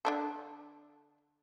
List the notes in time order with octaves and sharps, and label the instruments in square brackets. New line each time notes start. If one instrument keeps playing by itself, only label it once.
[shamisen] D3 D4 A4